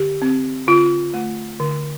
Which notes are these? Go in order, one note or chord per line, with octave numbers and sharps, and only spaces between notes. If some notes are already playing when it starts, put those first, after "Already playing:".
Already playing: D3 G4
C4
D3 F4
A3
D3